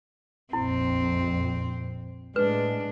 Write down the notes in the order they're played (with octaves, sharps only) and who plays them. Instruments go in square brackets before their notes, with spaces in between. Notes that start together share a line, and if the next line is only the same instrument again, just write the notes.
[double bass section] A#1 F2 [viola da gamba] C4 [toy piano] E4
[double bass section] A2 G#3 [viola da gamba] D4 [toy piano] B4